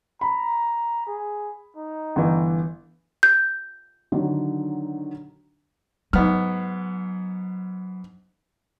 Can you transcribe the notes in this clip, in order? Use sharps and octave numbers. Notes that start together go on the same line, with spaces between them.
A#5 B5
G#4
D#4
G1 E3
G6
D3 D#3 F#3
G#2 F#3 B3 F6